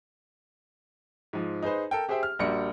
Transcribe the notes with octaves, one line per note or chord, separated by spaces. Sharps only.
G#2 F3
D#4 G#4 B4 C5
A4 A#4 G5
G4 G#4 C5 E5 G5
F6
A#1 G3 A#3 F#4 C#7